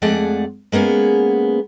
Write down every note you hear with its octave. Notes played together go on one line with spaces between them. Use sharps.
F2 G#3 A3 G#4 D5 F#5
G#3 A#3 B3 C#4 G#4